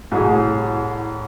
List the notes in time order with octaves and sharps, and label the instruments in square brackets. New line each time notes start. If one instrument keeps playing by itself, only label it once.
[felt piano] C2 A2 F#4 G#4